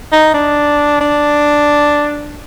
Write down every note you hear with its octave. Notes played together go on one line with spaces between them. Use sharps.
D#4
D4
D4